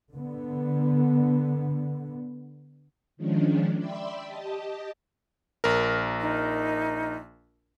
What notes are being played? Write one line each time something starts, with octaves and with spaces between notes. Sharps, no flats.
D3 B3
D#3 F3 G#3 C#4 D4
D5 E5 G5 B5 C6 E6
G4 D#5 A5
A#1 A#4
D#4